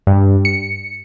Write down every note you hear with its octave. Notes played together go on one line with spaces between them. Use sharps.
G2
C#7